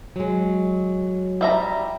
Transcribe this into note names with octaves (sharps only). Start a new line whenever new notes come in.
F#3 G#3
G3 E5 A#5